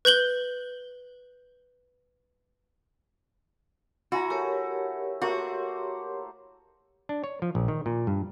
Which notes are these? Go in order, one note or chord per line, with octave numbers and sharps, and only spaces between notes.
B4 G6 F#7 G7
E4 F#4 G#5 A#5
A3 G4 A#4 C#5
A3 A#3 F#4 C5
D4
C#5
F3
A#1
D#3
A#2
G2